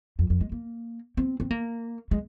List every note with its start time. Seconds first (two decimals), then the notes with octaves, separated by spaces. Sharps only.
0.19 F2
0.30 F2
0.41 G#3
0.52 A#3
1.17 C4
1.40 C4
1.51 A#3
2.11 G#3